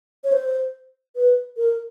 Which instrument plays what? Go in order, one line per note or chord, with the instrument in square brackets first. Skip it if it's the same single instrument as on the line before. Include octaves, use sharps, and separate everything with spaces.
[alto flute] C#5
C5
B4
A#4